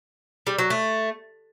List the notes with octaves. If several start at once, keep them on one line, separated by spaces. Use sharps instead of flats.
G3
F#3
A3